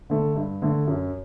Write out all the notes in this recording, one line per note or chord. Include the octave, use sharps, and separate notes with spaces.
D3 A3
G2
D3 A3
F#2